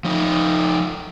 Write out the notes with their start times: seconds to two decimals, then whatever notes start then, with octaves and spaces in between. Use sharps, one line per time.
0.04 F3 D#4